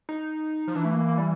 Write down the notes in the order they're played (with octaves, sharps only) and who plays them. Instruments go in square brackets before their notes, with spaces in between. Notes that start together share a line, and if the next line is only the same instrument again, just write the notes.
[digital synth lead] D#4
[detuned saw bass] F3
[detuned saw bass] E3 [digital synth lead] D4
[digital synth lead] A3
A#3
A#3
G3